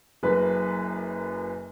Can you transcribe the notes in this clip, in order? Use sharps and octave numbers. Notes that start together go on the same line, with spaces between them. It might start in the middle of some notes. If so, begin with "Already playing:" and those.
F#1 F#2 B4